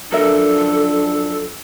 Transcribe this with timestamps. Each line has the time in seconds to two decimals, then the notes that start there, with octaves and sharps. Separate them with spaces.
0.12 F#2 F3 D4 A4 A#4 E5